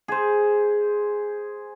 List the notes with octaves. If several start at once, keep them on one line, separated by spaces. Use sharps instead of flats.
G#4 C5